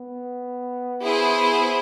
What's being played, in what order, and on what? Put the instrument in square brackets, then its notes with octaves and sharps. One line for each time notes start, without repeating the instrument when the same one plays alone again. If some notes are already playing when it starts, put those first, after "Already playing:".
Already playing: [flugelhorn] B3
[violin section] E4 G#4 C5